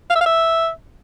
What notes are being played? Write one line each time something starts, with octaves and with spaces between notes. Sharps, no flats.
F5
E5
F5
E5